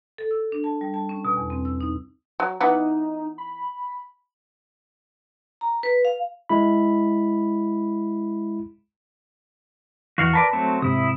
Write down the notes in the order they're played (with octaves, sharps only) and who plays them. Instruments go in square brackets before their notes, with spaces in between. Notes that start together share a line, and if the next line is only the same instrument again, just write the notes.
[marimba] A4
E6
D4
A5
G3
A5
C#4
B2
E2
C4
E6
D#4
[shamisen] F#3
[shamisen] E3 B3 F#5 [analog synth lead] D#4
[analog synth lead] B5
[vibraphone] A#5
B4
F5
[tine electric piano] G#3 E4 B5
[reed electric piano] E2 E3 [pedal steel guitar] F#4 F5 F#5
[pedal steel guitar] A#4 B4 D5 [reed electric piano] A5
[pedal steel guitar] F#3 A3 C4
[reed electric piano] G#2 C3 [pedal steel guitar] E4 D#6